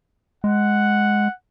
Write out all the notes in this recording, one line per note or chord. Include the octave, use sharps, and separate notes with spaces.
G#3 F#5